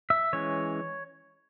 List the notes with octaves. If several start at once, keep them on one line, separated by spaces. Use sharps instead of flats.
E5
E3 G#3 C#4 C#5